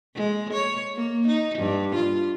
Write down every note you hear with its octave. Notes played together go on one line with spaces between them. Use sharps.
G#3
C#5
A#3
D#4
G2
F4